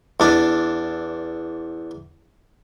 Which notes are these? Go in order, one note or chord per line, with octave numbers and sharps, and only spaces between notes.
E2 D4